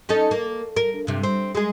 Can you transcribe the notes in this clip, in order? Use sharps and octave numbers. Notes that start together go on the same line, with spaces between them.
C#4 D#4 A4
A#3
A#4
G2 C3
C4
G#3 G#4